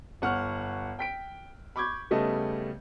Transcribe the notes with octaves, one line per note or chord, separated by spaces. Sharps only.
G1 F#5 C#6 F6
G5 B6 D7
B5 C#6 D6 G6 G#6
C#3 G3 A3 B3 D#5 A5